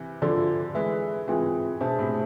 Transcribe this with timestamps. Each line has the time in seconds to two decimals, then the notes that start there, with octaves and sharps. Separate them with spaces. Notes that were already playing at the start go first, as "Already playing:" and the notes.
Already playing: C3 E3
0.22 D3 F3 F4 A4 D5
0.75 E3 G#3 G#4 B4 E5
1.28 E3 G#3 C4 F4 G#4
1.81 B2 D4 G#4 C5 E5 A5
1.99 A2 C3